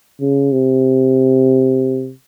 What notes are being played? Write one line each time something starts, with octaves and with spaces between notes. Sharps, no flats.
C#3
C3